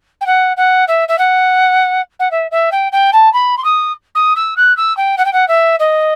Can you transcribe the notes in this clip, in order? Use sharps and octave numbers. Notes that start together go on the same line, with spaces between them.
G5
F#5
F#5
E5
E5
F#5
F#5
E5
E5
G5
G5
A5
B5
C6
D#6
D#6
E6
F#6
E6
G5
F#5
G5
F#5
E5
D#5